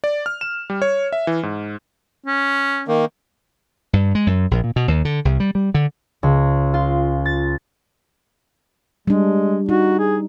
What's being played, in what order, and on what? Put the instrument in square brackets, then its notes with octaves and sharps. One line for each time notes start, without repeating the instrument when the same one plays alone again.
[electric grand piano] D5
F6
E7
G3
C#5
E5
E3
G#2
[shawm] C#4
[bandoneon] D#3 A#3
[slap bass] G2
G#3
F#2
A#1
A#2
B2
D#2
D3
C2
G3
G3
D3
[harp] C#2
F4
A6
[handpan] G3 D4 [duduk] G#3
[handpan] D#4 [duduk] F#4
[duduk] G#4